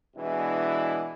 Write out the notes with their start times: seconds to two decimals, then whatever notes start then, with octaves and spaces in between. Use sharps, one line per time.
0.16 B2 E3 G#3 D4 E4